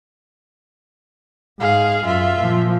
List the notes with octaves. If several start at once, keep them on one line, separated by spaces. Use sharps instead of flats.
G#2 G#4 F5
F#2 F4 E5
A#2 F3